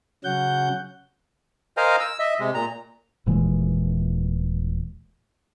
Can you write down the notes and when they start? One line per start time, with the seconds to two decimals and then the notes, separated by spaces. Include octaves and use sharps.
0.24 C#3 F#3 C#4 F#5 G6
1.77 A#4 C5 D#5 F5 G#5 A#5
2.00 E6
2.19 D#5 E5
2.40 C3 G#3
2.54 A#2 A#5
3.26 D#1 A#2 E3 G#3